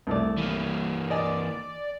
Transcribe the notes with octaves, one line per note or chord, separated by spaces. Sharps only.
C2 A3 D5
E3 A#3
D5 D#5 G#5